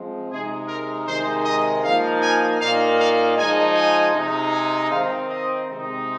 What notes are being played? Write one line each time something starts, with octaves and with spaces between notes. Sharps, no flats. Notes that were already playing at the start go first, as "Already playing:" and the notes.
Already playing: F3 G#3 C4
C3 G#3 D#4 G#4
A#4
C3 D#3 G#3 D#4 C5
D#5
F3 A#3 D#4 F5
G#5
A#2 A#3 D#4 F5
F5
F3 G#3 D#4 G#5
G#5
C3 G#3 D#4
G#5
D#3 C4 D#4 F5
D#5
C3 G#3 C4 D#4